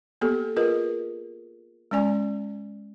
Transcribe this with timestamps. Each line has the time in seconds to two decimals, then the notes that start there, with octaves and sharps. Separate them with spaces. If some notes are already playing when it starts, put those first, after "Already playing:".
0.21 A#3 B3 G4 A4
0.56 F4 G#4 A#4 B4 D#5
1.91 G#3 C#4 D5 G#5